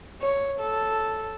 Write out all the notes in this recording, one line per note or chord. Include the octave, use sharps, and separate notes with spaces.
C#5
A4